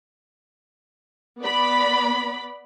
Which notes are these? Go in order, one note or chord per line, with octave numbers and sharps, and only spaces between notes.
B3 D5 B5